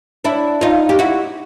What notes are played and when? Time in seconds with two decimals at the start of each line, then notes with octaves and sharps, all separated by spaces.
0.24 D4 E4
0.61 D#4 F4
0.89 G4
0.99 E4 F#4